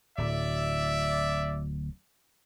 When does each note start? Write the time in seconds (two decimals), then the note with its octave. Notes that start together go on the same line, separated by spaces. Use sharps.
0.18 D1 D5 E5